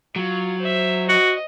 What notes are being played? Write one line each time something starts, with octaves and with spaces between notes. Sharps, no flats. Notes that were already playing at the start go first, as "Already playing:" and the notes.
F#3 F4
C5 E5
F#4 D#5